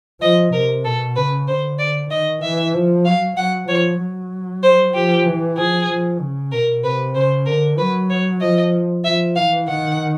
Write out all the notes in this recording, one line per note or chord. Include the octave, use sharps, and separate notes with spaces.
F3 D#5
C3 A#4
B2 A4
C#3 B4
D3 C5
D5
D#3 D#5
E3 E5
F3
F#3 F5
F#3 F#5
F3 C#5
F#3
C5
F3 G4
E3
F3 G#4
F3
C#3
B2 A#4
C3 B4
C#3 C5
D3 A#4
F#3 B4
C#5
F3 D#5
F3 E5
E3 F5
D#3 F#5